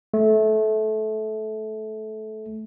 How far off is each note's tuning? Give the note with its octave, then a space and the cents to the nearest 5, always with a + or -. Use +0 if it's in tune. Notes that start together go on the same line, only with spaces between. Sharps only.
A3 -20